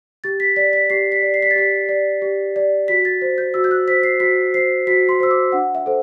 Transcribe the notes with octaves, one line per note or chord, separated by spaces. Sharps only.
G4 A6
B6
D5 B6
B6
G4 C7
B6
D5
C7
B6
A6
G4 B6
D5
G4
D5
F#4 B6
A6
C5
G6
F#4 E6
G6
F#6
C5 B6
C7
F#4 B6
C5 C7
F#4 B6
C6
C5 E6
D6
D4 F#5
E5
A4 C5